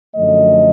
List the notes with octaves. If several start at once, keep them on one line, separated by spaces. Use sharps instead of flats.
F#2 D3 F3 A3 D#5